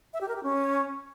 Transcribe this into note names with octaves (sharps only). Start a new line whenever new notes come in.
E5
G4
A#4
G4
C#4